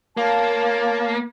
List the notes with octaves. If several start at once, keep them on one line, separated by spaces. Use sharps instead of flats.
A#3 F4 C#5 A5